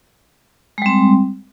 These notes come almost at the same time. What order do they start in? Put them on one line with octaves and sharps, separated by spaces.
G#3 G3 C4